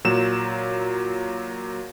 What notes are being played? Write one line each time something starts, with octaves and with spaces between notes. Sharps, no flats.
A#2 F#3 E7